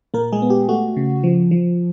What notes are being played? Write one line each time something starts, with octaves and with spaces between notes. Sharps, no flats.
A#2 A#3 A#4
G#3 G#4
B3
G4
A3 F#4
C#3
F3
F3